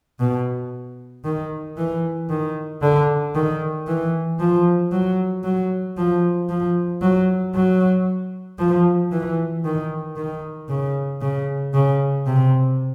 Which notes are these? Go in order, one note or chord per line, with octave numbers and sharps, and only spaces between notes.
B2
D#3
E3
D#3
D3
D#3
E3
F3
F#3
F#3
F3
F3
F#3
F#3
F3
E3
D#3
D#3
C#3
C#3
C#3
C3